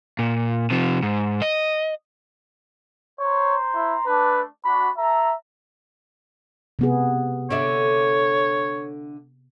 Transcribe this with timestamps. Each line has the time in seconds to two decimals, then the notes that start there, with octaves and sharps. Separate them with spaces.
0.19 A#2
0.71 C3 F3
1.03 G#2
1.42 D#5
3.20 C5 C#5 A#5 C6
3.75 E4
4.06 A3 D4 B4
4.65 D4 F#4 B5
4.98 A4 E5 A#5
6.79 C3 B3 G#4
7.50 D3 C#5 D5 E5